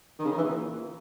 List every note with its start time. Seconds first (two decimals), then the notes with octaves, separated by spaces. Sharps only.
0.19 D#3
0.25 C#3
0.32 D#3
0.38 E3
0.44 A#2